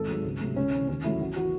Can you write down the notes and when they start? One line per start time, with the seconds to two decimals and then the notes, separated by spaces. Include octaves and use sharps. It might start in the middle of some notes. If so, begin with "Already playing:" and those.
Already playing: G#1 A4
0.08 G#2 F#3
0.24 C#2
0.40 C3 F#3 A3
0.56 C#2 C#4
0.73 C3 E3
0.88 D#2 C#4
1.04 D#3 F#3 A3 E4
1.20 A1 F#4
1.36 E3 F#4